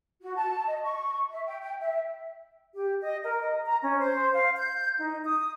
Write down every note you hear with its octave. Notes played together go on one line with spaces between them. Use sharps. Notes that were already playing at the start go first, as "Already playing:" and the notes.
F#4
A5
D#5
C#6
E5
G5
G5
E5
G4
D#5
A#4
D#5
A#5
C#4
C5
F5
G6
D#4
D#6